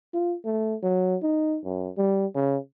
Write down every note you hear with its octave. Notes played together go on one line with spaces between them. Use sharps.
F4
A3
F#3
D#4
F#2
G3
C#3